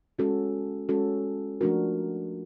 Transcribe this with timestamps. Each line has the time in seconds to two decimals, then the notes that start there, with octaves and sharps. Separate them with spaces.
0.19 G#3 C#4 F#4 A4
0.89 G#3 C#4 F#4 A4
1.61 F3 A3 D4 F#4 A#4